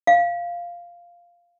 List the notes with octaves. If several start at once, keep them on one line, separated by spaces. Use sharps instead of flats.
F5